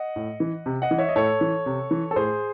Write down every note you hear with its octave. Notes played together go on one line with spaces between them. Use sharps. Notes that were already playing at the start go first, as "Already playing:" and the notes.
Already playing: D#5 F#5
A2
E3
C3
D#5 F#5
E3
C#5 E5
D#5
A2 A4 C#5
E3
C3
E3
A4
A2 G#4 C5